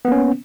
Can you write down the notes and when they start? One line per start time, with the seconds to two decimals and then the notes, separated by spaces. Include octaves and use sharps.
0.05 B3
0.08 A#3
0.12 C#4